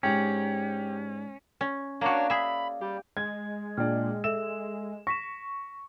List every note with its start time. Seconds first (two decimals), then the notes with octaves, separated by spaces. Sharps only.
0.03 G#2 C#4 D4 G4 A#5
1.61 C#4
2.01 A#3 D4 F#4 C#5 D5 F5 A#5
2.30 G#4 E5 B5
2.81 G3 G4
3.17 G#3 G#6
3.77 A#2 D4 G5 F6
4.24 A4 E5 E6 E7
5.07 C#6 A#6 B6 E7